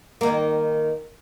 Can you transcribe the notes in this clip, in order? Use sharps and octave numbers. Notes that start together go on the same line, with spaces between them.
D#3 A#3